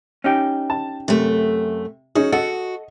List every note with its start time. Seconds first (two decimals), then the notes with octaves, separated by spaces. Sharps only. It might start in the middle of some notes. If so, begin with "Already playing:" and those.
0.24 C#4 D#4 G4
0.70 A5
1.08 F#2 C3 A3
2.15 C#4 D#4 F#4 G#4
2.32 F#4 A4 D#5 F#5